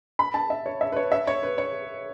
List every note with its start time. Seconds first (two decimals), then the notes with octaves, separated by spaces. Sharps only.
0.19 B5
0.34 A5
0.50 E5
0.66 C#5
0.81 E5
0.92 B4
0.96 C#5
1.12 E5
1.27 C#5
1.43 B4
1.58 C#5